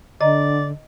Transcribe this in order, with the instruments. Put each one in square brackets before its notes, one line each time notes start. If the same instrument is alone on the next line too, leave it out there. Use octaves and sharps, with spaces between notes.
[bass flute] D3 [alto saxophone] D5 [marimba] D#5 A#5